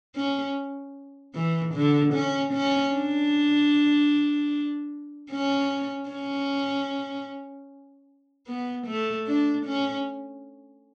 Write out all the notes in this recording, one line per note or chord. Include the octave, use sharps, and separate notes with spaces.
C#4
E3
D3
C#4
C#4
D4
C#4
C#4
B3
A3
D4
C#4